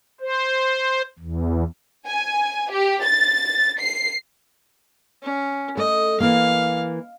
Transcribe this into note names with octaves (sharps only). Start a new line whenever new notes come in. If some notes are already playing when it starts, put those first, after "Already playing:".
C5
E2
G#5
G4
A6
C7
C#4
A3 D#5
E3 A#3 F5